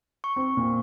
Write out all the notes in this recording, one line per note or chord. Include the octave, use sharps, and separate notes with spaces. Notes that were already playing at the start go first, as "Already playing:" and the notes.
C#6
C4
A#2